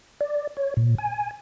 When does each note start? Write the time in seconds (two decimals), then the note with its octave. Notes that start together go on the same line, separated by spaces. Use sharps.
0.21 D5
0.57 C#5
0.77 A#2
0.98 G#5